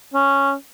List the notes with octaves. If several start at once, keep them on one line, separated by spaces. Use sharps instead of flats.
C#4